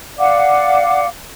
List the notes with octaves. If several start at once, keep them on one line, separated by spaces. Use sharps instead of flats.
D5 F5 F#5 D6